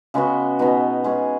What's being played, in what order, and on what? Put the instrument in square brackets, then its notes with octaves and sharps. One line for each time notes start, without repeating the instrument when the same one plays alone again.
[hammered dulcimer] C#3 G#3 B3 F#4
B2 G#3 B3 D#4
G#3 C#4 G#4